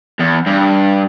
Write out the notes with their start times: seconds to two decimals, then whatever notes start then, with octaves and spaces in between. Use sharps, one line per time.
0.19 E2
0.46 G2